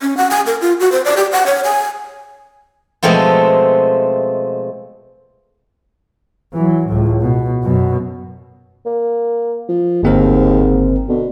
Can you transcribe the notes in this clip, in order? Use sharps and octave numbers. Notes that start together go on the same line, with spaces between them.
C#4
F#5
G#5
A#4
F4
F#4
C5
D5
G4
F#5
C#5
G#5
B2 F3 G#3 A3 C4 F4
E3 F#3
C#2 A2
B2
F#2 B2
A#3
F3
G1 D#2 G#2 C4 A#4
B2 D3